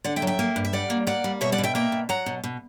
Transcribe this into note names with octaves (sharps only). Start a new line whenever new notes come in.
D3 D5 F#5
E5 G5
F#3
E5 G5
A#3
G2
E5
G3 D5 F#5
A#3
A#3 D5 F#5
G3
B2 C#5 E5
D5 F#5
B2
E5 G5
A#3 E5 G5
B2
F#3 F#5 A#5
B2
B2